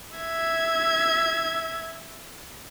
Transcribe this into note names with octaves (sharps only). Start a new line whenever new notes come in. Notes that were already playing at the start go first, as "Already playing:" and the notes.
E5 G#6